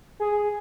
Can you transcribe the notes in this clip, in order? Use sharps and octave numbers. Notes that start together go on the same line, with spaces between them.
G#4